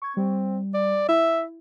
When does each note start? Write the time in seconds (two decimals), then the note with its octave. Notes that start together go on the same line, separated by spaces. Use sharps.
0.02 C#6 G#6
0.17 G3 C4
0.74 D5
1.09 E4 E5